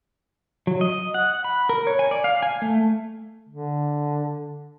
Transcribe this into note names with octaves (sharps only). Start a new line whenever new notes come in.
F#3
D#5
F#5
B5
A#4
C#5
G#5
D5
F5
G#5
A3
D3